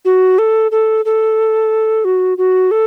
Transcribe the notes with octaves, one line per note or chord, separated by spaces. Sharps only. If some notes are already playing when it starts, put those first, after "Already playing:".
F#4
A4
A4
A4
F#4
F#4
A4